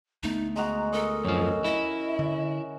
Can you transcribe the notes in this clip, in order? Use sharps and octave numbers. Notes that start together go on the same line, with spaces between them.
D2 A3 B3 D#4
G#3 F#4 A#5
A4 A#4 D#5
F#2 F3 C#4 F#4
E4 D#5
D3